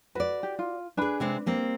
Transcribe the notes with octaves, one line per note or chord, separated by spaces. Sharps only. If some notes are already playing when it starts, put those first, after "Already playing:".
F#4 B4 D5
G4
F4
D4 G#4 B4 G#5 B5
C3 G#3 C4
G3 A#3 C4